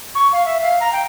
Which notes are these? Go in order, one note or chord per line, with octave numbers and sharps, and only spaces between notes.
C#6
F5
E5
F5
A#5
G5